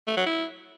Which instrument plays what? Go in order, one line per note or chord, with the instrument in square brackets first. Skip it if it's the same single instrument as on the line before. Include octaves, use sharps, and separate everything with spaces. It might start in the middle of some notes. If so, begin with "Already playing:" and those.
[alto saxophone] A3
F#3
E4